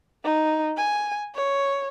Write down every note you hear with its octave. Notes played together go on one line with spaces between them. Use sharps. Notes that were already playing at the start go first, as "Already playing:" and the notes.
D#4
G#5
C#5